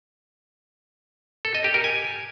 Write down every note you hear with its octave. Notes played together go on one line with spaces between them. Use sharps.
A4
D#5
G4
A#4
G#5